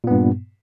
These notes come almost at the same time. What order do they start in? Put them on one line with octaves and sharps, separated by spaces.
A#2 B3 G2